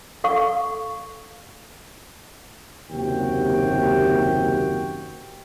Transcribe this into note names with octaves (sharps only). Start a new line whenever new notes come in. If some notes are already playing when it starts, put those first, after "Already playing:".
A4 F5 C#6
F#1 D#2 C3 F#4 G5